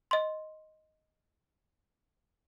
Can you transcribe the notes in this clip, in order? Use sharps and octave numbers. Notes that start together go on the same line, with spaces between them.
D#5 C6